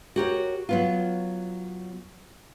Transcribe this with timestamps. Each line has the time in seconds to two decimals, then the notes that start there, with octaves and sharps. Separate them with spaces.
0.16 F#4 G4 A#4 C#5
0.69 F#3 B3 F4